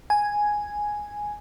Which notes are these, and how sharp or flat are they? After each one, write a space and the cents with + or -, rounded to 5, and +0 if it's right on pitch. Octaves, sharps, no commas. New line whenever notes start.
G#5 +0